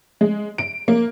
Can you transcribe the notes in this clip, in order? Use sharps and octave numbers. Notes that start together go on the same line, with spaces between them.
G#3
D7
A#3